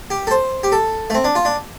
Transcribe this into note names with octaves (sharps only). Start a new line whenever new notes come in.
G4
A4
C5
G4
A4
A3
C4
D4
F4
D4